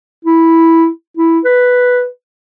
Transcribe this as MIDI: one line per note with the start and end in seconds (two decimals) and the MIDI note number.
0.25 0.88 64
1.17 1.39 64
1.44 2.06 71